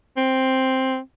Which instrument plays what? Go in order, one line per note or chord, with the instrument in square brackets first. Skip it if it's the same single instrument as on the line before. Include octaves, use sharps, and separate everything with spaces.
[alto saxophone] C4